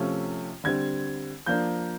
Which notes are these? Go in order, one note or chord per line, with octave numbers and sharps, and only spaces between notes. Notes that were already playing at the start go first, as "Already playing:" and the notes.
Already playing: C3 F3 A3 C#4
D3 G3 C4 G#6
F3 A#3 D4 G6